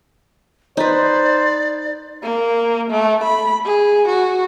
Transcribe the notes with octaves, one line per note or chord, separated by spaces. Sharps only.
D#4 B4 C5 D5
A#3
A3
B5
G#4
F#4